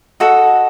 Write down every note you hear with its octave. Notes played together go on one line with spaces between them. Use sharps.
F#4 A4 D#5